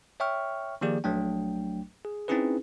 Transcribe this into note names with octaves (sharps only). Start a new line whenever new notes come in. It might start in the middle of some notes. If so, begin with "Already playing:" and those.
C#5 E5 G5 C#6 F6
D#3 F3 A#3 G4 G#4 D5
A#1 F#3 A3 D4 G5
G#4
C4 C#4 D#4 E4 G#4 B4